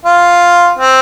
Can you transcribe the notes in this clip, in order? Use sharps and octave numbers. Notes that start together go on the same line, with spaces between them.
F4
C4